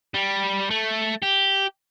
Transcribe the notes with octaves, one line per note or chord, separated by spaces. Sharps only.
G3
A3
G4